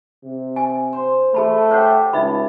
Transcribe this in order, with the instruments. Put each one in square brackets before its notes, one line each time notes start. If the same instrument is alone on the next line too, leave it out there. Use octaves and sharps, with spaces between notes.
[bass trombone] C3
[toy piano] G#5
[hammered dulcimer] C5
[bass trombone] A3 [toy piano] G#4 A5 B5
[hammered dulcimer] G4 [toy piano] C5 C#5 F#5
[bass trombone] C#2 [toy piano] D#4 E5 B5